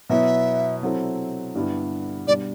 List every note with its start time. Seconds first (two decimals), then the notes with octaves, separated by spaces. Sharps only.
0.10 B2 F#3 B3 E4 B4 E5
0.82 C3 F#3 C4 E4 A4
1.55 G2 D3 G3 B3 E4
2.27 B2 G3 D4 D5